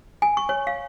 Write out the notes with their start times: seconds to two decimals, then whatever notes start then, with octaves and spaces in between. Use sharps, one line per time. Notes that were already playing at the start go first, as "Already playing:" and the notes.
0.22 G#5
0.37 C#6
0.49 C#5
0.67 F5